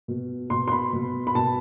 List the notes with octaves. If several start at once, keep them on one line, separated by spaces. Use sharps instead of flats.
B2
B2 C6
C6
B5
B2
B5
B2 A5